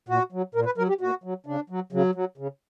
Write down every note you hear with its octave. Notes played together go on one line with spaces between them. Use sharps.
A#2 F#4
F#3
A#2 A#4
B4
F#3 A#4
G4
A#2 F#4
F#3
C#3 D4
F#3
C#3 F#3
F#3
C#3